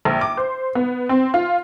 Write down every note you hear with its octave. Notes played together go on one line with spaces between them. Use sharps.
A#1
D6
C5
B3
C4
F4